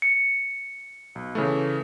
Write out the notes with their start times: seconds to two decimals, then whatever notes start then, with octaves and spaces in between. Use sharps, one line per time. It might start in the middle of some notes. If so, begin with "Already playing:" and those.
0.02 C#7
1.15 B1
1.35 C#3 E3 A3